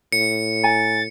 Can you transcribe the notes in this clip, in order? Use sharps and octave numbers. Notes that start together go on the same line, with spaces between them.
A2 C#7
G#5 A#5 A6